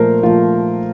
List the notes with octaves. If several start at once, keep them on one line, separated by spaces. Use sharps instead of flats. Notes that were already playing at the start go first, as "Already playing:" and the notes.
Already playing: A#2 F3 A3 A#4 C5
A#2 F3 A3 F4